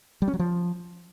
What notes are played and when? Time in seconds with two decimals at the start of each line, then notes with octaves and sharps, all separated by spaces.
0.22 G3
0.28 C#4
0.34 F#3
0.39 F3